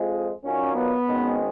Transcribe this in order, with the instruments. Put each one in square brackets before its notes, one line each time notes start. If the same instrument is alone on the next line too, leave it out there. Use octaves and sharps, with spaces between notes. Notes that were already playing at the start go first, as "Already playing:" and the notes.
Already playing: [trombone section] F2 F3 G#3
[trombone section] A#2 F#3 A#3 D#4 [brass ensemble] C#4
[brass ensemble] B3
[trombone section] G#1 G#2 D#3 G#3 C#4